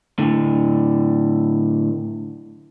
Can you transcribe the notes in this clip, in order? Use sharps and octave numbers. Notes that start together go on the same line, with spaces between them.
A2 D3